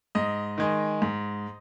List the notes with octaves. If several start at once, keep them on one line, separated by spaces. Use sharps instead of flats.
G#2 D#5
D#3 G#3
G#2